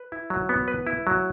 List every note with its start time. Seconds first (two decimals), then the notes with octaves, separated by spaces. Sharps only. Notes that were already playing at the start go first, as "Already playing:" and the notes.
Already playing: B4
0.12 E4
0.30 F#3
0.49 B3
0.68 B4
0.87 E4
1.07 F#3